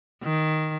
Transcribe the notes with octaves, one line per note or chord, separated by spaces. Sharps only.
D#3